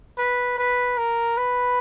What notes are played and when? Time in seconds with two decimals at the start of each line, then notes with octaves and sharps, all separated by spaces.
0.18 B4
0.58 B4
0.98 A#4
1.37 B4